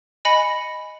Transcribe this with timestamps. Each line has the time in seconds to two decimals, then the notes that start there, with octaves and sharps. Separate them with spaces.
0.25 D#5 G#5 B5 A#6 C#7